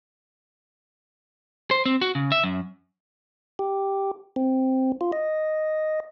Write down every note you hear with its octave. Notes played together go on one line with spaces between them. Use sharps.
C5
C4
F#4
C#3
E5
F#2
G4
C4
F4
D#5